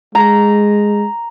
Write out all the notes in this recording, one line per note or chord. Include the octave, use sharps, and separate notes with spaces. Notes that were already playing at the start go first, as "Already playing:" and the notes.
G#3 A#5